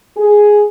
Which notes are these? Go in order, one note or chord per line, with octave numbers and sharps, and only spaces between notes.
G#4